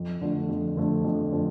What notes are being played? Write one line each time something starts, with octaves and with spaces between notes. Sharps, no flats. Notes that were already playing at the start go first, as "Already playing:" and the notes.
Already playing: F2
D3 F3 A3
F2
D3 F3 A3
F2
D3 F3 A3